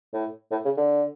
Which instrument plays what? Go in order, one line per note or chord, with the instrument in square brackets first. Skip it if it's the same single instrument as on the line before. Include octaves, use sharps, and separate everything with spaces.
[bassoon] A2
A2
C#3
D3